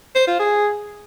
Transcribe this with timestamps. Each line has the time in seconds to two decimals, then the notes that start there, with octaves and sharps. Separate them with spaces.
0.15 C5
0.27 F4
0.39 G#4